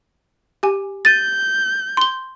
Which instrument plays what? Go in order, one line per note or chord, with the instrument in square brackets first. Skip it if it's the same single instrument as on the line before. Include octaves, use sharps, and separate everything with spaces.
[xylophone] G4 G#5
[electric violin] G6 [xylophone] A6 D#7
[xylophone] C6 G7